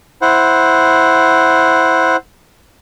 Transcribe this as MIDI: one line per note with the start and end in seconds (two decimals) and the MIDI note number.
0.22 2.16 64
0.22 2.16 72
0.22 2.16 78